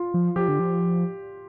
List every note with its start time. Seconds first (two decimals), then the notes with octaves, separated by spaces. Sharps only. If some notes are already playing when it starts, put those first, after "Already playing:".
Already playing: F4
0.14 F3
0.36 F3 G4
0.48 D3
0.59 F3